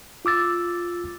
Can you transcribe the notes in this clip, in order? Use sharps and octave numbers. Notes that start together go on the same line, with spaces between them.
F4 D6 E6 A6